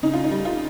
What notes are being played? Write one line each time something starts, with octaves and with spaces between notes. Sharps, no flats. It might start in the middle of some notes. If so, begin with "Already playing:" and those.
C#3 D#4
F4
D#4
G3
F4